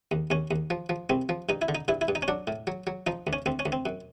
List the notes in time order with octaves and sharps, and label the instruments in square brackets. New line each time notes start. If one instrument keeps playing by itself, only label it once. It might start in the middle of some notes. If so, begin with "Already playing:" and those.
[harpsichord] D#2
D#2 C#4
D#2
F3
F3
C2 C4
F3
G2 D#4
E4
D3
D#4
G2 E4
E4
G2
D#4
C#4
F#3 D4
A2
F#3
F#3
F3 D#4
D2
C#4
D2 C4
C#4
D2
C4
F#2